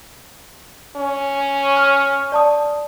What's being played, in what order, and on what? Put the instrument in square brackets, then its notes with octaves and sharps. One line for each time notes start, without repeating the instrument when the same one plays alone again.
[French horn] C#4
[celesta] C#6 F6
D5 A5 D#6